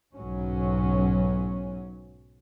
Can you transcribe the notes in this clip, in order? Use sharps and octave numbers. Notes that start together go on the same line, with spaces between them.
B1 G#2 F#3 C#4